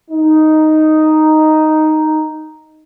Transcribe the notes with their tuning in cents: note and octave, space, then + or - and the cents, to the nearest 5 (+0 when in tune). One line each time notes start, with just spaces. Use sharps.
D#4 +0